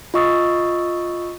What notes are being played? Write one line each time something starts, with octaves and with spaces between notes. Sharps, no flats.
F4 D#5 C#6 D#6 E6 A6